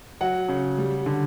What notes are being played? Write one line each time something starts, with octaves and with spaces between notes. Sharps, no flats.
F#3 F#5
C#3
G3
D3